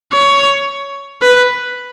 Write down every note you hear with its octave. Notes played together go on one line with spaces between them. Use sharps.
C#5
B4